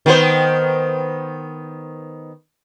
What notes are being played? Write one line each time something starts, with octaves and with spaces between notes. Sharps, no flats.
D#3 B3 C5